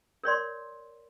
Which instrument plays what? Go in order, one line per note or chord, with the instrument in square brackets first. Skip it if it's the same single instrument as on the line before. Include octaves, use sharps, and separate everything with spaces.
[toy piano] A#4 C#5 D5 C6